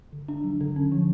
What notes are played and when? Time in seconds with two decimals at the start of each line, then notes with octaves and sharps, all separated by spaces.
0.12 D3
0.28 D4
0.44 F#3
0.61 D3
0.76 C#4
0.92 F3